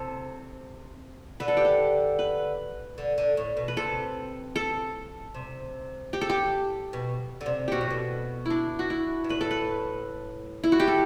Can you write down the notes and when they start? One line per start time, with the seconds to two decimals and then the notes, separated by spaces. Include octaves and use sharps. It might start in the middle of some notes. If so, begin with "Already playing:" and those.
Already playing: C3 A4
1.40 D3 B4
1.48 A4
1.57 G4
1.65 A4
2.19 B4
2.98 D3
3.18 D3
3.37 A2
3.57 B2
3.68 B4
3.77 C3 A4
4.56 A4
5.34 C3
6.13 G4
6.21 A4
6.30 G4
6.93 B2
7.41 D3
7.46 C3
7.68 B2 F#4 G4
7.81 A2
7.90 B2
8.46 D4 E4
8.79 F#4
8.90 E4
9.24 G2
9.29 A2 B4
9.41 A4
9.51 B4
10.64 E4
10.72 F#4
10.80 G4
10.87 A4